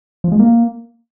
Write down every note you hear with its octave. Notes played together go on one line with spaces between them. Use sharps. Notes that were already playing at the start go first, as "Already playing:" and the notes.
F3
G#3
A#3